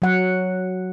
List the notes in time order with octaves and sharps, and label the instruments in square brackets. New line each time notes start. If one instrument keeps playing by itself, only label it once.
[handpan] F#3 F#5